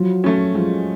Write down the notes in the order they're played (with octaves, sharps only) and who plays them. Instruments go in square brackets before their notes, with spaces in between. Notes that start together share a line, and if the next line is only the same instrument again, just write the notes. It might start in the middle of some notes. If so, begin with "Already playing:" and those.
Already playing: [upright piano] F3 [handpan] F#3
[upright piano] A3 C#4
[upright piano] F3 [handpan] G#3